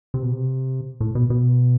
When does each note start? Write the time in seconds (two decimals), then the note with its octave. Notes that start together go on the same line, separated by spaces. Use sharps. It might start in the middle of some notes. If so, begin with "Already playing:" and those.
0.14 C3
0.23 B2
0.33 C3
1.01 A2
1.15 B2
1.30 B2